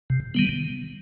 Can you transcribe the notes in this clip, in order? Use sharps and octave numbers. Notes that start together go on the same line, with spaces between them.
C3
D#3 G3 B3